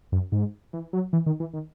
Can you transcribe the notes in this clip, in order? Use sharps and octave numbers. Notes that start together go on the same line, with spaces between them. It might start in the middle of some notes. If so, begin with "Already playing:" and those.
F#2
G#2
E3
F#3
E3
D#3
E3
D#3